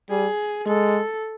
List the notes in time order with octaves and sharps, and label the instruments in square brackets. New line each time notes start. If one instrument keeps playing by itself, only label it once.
[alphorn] G3 [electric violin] G#4
[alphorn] G#3 [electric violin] A4